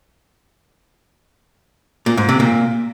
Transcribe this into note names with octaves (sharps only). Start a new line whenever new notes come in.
A#2
G#2
C3
A#2